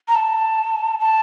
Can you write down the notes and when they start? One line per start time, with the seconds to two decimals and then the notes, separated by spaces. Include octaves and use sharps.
0.08 A#5
0.15 A5
0.99 A5